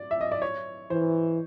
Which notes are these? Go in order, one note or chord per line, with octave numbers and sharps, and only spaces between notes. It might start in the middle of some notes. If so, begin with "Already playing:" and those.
Already playing: D5
E5
D#5
D5
C#5
E3 C5